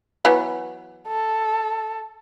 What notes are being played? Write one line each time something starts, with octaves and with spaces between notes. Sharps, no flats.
E3 F#3 B3
A4